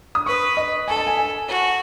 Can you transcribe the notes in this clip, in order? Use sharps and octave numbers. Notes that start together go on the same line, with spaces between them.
D#6
B4 C#6
D#5
A4 G#5
A5
G#5
G#5
F#4